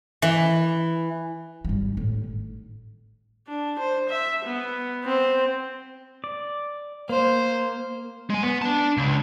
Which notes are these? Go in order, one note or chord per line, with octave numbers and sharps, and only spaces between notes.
E3
G#1 G3
A2 D#3
D4
C5
E5
B3
C4
D5
A#3 C5
G#3 G#5
B3
D4 A5
C#2